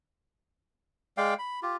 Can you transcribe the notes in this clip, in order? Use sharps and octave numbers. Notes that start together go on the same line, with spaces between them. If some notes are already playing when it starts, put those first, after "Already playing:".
G#3 D5 F5 G5
B5
F4 G4